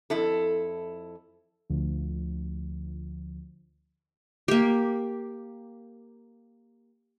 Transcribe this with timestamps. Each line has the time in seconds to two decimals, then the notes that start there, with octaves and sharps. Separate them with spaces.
0.10 F2 E4 A4
1.70 D2 F3
4.48 A#3 G4